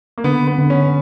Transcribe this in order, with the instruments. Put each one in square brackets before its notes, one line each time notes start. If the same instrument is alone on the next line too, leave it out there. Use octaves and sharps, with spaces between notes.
[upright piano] A#3
[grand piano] D3 [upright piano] B3
[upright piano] B3
[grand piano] D3
[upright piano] C#4